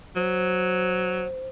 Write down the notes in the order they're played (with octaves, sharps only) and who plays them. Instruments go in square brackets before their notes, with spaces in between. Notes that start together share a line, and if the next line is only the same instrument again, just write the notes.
[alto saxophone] F#3 [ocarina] C5